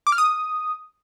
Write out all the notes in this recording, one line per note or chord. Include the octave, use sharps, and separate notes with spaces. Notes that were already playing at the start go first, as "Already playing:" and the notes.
D6
F6
D#6